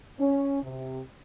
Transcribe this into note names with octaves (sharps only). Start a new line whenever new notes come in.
C#4
C3